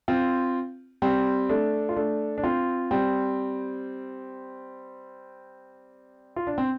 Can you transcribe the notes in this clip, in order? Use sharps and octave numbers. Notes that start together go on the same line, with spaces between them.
C4 F4
G3 C4
A3 D4
F4
A3 D4
D4
C4 F4
G3 C4
F4
D4
C4